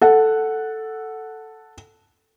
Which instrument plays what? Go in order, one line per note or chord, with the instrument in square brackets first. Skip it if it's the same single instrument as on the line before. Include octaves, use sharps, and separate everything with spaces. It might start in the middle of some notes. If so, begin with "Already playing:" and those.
[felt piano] A4 F#5